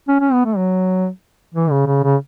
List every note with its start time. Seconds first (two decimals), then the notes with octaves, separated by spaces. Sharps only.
0.09 C#4
0.21 C#4
0.33 B3
0.45 A3
0.57 F#3
1.55 E3
1.71 C#3
1.87 C#3
2.04 C#3